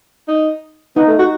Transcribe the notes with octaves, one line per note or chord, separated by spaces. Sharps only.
D#4
B3 D#4
A3
F#4